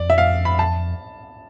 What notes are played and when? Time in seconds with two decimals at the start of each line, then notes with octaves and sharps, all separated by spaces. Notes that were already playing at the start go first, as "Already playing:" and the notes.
Already playing: F2 D5
0.10 E5
0.18 F5
0.45 B5
0.59 A5